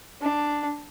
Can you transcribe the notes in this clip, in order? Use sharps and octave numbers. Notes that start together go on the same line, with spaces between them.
D4